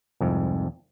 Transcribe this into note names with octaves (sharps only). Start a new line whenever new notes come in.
C2 F2 G#2